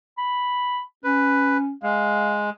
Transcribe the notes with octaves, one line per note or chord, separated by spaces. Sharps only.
B5
C#4 B4
G#3 F5